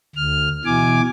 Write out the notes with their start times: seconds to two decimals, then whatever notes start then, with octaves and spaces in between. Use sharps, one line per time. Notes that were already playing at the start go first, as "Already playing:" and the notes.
0.16 D2 F6
0.65 B2 E3 G#5 D6